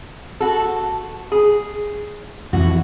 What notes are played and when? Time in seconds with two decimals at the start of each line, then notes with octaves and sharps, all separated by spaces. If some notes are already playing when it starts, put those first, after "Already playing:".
0.40 F#4 A4
1.32 G#4
2.53 F2 E3 F#4